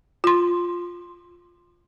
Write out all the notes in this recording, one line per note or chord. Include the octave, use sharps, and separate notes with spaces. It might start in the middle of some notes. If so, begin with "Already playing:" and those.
F4 C6